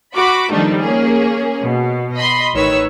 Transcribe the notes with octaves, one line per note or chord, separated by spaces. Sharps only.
F#4 B5 D6
D#3 F3 G3 A3 D4 D#4
A#3 C#4 G#4
B2
D#5 B5 C6
A1 D#3 B4 C#5 E6